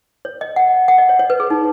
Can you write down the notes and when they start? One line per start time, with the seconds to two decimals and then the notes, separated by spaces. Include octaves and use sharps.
0.25 C#5
0.41 D#5
0.56 F#5
0.88 F#5
0.98 D#5
1.09 C#5
1.19 C#5
1.30 B4
1.40 G#4
1.50 D#4